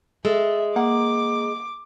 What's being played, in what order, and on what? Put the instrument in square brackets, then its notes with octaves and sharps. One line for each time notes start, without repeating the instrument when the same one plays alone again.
[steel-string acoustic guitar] G#3 [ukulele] A4 [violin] E5
[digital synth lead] A#3 [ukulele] F#5 [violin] D6